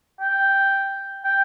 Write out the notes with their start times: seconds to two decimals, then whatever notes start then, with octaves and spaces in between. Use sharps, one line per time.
0.20 G5
1.25 G5